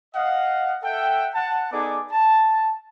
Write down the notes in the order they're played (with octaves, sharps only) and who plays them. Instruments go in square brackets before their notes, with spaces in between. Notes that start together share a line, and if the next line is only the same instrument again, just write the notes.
[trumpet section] D#5 F5 F#5
A4 E5 F#5 G5
F#5 A5
B3 D#4 G#4 A4 D5 D6
A5